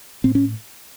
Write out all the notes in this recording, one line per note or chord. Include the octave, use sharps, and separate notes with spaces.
A2 C4
C#4